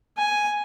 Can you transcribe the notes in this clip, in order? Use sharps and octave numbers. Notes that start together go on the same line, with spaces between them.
G#5